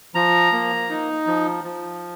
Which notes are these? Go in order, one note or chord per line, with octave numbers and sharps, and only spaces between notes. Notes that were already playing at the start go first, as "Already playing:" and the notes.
F3 A#5
A#3
D#4
F3
F3